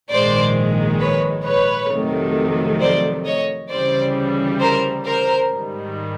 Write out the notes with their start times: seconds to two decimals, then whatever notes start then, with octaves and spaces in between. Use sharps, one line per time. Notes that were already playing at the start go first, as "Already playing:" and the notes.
0.10 A#1 G#2 D#3 G#3 C5 D5
1.00 B4 C#5
1.45 B4 C#5
1.91 F2 C3 D#3 F#3 A3
2.80 C5 D5
3.25 C#5 D#5
3.71 D2 C#3 E3 G3 C5 D5
4.61 A#4 C5
5.06 A#4 C5
5.52 G#2 D#3 G3